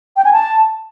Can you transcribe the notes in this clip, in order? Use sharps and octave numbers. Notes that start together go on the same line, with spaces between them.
G5
G#5
A5